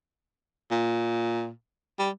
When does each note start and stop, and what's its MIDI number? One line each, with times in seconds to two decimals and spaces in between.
0.71 1.49 46
1.99 2.09 55